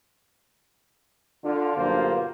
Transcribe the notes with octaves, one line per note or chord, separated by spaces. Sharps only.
D3 F4
B1 G2 D3 A#3 F4 C5